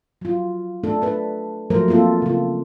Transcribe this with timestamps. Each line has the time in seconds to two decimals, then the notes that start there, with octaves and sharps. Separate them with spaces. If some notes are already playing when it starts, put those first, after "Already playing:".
0.21 F#3 F4
0.83 A3 D4 A4
1.02 D4 B4
1.70 F3 F#3 A3 A#4 C5
1.88 A#3 C4 F4 A4
2.22 C#3 F4